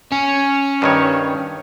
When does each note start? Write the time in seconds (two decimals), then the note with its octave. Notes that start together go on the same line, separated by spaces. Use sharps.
0.12 C#4
0.82 G2 D#3 C#5